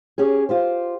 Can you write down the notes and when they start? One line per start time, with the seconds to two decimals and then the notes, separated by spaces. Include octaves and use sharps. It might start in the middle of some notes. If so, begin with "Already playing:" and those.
0.18 C#4 G4 G#4
0.49 F4 G4 C5